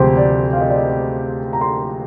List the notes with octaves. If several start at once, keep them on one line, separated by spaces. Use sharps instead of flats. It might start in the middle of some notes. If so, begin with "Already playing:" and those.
Already playing: D2 C3 F3 G#3 G4 G#4 C5
D5
F5
D#5
D5
D#5
G5
A#5
C6